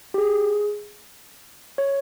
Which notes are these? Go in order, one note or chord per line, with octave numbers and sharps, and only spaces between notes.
G4
G#4
C#5